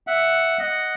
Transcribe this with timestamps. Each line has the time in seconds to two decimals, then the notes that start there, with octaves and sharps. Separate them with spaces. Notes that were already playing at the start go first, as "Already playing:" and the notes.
0.07 E5 F#5
0.59 D#5 F#5